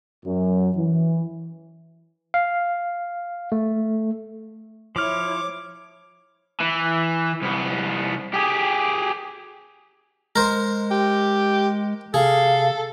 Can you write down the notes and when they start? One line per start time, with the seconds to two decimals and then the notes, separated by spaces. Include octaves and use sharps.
0.25 F#2
0.75 E3
2.34 F5
3.52 A3
4.96 F3 E4 C#5 D6 F6
6.60 E3
7.42 C2 B3
8.34 G4 G#4
10.36 G#3 A#4 C5
10.91 G4
12.14 C3 G#4 A4 F5